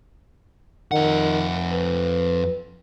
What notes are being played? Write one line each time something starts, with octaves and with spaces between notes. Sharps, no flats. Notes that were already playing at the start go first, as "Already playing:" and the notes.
F2 D#3 F#5
B4